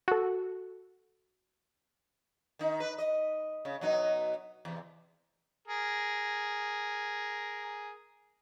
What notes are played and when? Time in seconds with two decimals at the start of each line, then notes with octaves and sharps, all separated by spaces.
0.08 F#4 A4
2.59 D#3 D#4
2.80 B4
2.98 D#5
3.65 C#3
3.81 B2 F#3 D#4
4.65 E2 C3
5.68 G#4 A#4